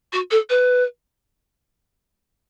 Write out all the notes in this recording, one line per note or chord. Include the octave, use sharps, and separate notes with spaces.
F#4
A4
B4